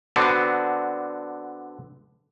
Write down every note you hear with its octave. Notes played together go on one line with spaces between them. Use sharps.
D3 B3 C4 D4 F#4